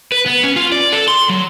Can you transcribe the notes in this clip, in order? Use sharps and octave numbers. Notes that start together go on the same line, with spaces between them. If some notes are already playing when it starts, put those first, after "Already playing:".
B4
B3
C#4
F4
D5
A4
C6
F#3